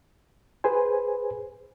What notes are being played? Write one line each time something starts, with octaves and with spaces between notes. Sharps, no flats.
G#4 B4 C5 G#5